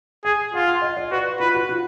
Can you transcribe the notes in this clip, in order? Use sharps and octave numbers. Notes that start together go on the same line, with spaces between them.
G#4 G#5
F4 F#5
F#5
D#5
D5
F#4 B4
F4 B4
F#4
F4